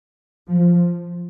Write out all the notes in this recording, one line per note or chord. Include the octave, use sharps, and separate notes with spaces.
F3